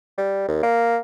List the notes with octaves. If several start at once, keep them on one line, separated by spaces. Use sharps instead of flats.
G3
D#2
A#3